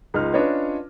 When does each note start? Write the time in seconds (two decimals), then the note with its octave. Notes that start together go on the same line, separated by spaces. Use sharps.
0.14 C#2 D#4 F4 F6
0.34 C#4 D4 F4 B4 C#5 D#5